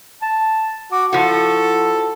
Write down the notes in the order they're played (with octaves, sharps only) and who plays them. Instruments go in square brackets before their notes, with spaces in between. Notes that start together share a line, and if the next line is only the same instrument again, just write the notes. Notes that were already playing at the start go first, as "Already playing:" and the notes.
[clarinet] A5
[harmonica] F#4 [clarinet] D6
[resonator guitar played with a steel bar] F3 F#4 [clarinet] E4 [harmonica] A4